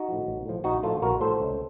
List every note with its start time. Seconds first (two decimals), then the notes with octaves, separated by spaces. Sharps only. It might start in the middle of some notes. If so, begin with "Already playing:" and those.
Already playing: D#4 F#4
0.08 A2 F3
0.27 A1
0.46 A2 F3
0.64 A#1 D#4 F#4
0.83 A2 F3 F4 A4
1.02 A#1 F#4 A#4
1.21 A2 F3 A4 C5
1.40 C#2